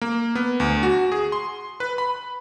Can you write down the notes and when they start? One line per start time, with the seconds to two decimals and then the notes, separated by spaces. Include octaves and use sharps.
0.02 A#3
0.35 B3
0.60 D2
0.83 F#4
1.12 G#4
1.32 C6
1.80 B4
1.98 B5